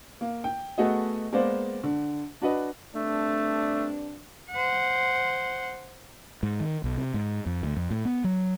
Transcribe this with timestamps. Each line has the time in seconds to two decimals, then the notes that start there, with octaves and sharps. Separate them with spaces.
0.21 A#3
0.44 G5
0.78 A3 B3 F#4 G#4 D#5
1.32 G#3 A#3 B3 C5 D5
1.84 D3
2.42 D4 F#4 B4 D#5
2.95 G2 A3 C4 D4
4.51 C5 F#5
6.43 G#2
6.60 D#3
6.84 B1
6.97 C3
7.14 G#2
7.46 F2
7.63 D2
7.77 F2
7.90 A2
8.05 B3
8.24 F#3